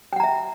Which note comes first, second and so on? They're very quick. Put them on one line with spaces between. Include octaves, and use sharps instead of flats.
G5 F#5 A#5 E5